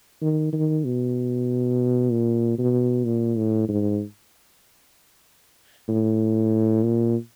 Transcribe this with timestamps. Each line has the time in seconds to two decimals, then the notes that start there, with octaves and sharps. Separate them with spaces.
0.22 D#3
0.53 D#3
0.85 B2
2.11 A#2
2.58 B2
3.04 A#2
3.37 A2
3.69 G#2
5.88 A2
6.83 A#2